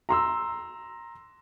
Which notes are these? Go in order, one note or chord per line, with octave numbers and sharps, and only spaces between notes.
A#5 C6 E6